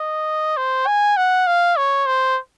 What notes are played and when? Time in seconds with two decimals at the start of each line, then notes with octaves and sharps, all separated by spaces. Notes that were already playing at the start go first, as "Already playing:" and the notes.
Already playing: D#5
0.57 C5
0.87 G#5
1.17 F#5
1.47 F5
1.77 C#5
2.07 C5